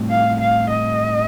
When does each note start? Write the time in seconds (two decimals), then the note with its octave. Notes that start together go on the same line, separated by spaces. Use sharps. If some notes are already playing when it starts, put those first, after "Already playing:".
Already playing: A2 G3 C4
0.10 F5
0.41 F5
0.70 D#5